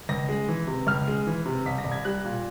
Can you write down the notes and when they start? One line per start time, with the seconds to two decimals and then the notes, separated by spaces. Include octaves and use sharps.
0.09 C#2 A#6
0.29 G#3
0.48 E3
0.67 C3
0.87 C#2 F6
1.07 G#3
1.27 E3
1.46 C3
1.66 C2 B6
1.78 A#6
1.84 C2
1.92 G#6
2.05 G3 F#6
2.24 A#2